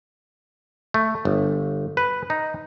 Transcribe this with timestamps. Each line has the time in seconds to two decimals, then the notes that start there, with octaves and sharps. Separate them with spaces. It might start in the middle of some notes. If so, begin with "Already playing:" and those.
0.94 A3
1.25 G1
1.97 B4
2.30 D#4